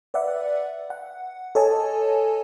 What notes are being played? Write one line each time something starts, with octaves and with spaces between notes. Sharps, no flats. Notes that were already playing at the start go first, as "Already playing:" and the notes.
B4 D5 E5 F#5
F#5
A4 C#5 D#5 G#5 A5